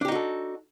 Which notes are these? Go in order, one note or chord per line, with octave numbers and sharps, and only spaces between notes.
D4 D#4 F#4 G4 A4